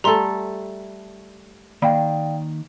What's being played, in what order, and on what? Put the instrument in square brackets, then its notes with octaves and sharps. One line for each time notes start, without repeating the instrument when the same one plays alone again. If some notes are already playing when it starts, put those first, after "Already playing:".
[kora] G3 A3 A4 [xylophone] A#5 C6
[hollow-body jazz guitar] D#3 A#3 B5 [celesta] D5 F5 G5